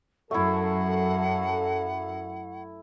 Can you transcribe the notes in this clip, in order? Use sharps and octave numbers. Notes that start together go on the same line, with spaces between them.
F#2 A3 E4 A4 F#5